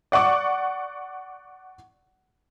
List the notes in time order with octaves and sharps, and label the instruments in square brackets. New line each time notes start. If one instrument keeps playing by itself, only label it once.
[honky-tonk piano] D5 F#5 C#6 D6